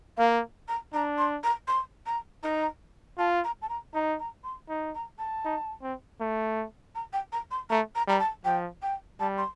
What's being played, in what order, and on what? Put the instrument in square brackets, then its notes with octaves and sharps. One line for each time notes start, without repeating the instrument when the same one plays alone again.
[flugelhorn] A#3 [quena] F5
[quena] A#5
[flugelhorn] D4 [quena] A#5
[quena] C6
A#5
C6
A#5
[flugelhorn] D#4 [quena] A#5
[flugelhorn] F4 [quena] A5
[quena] A#5
A5
A#5
[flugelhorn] D#4 [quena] A#5
[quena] A#5
C6
[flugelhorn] D#4
[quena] A#5
A5
[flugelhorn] D#4
C4
A3
[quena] A#5
G5
A#5
C6
[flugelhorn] A3 [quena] A#5
[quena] A#5
[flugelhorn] G3 [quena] A#5
[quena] A5
[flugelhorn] F3 [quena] G5
[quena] G5
[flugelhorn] G3 [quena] A5
[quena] C6